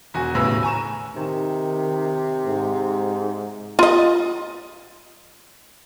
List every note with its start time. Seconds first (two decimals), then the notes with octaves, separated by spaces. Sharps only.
0.14 E1 F#4 G#5
0.35 D#1 B1 A2 C#3 B3 E6
0.63 G#5 A#5 C#6 E7
1.16 C3 D#3
2.46 G#2
3.79 F4 D#5